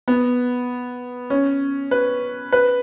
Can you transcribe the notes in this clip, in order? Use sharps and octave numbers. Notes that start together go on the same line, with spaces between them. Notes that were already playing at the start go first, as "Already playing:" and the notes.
B3
C#4
B4
B4